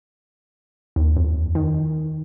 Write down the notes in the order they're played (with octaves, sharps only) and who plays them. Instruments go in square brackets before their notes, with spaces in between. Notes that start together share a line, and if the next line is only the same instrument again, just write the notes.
[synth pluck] D#2
F2
D#3